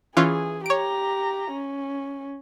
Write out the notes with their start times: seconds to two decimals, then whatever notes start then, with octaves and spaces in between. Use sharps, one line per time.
0.17 E3 C#4 F4 G#4
0.66 G4 C#5 A#5 D7
1.51 C#4